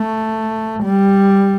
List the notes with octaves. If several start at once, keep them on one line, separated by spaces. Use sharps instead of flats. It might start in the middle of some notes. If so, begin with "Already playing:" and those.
Already playing: A3
G3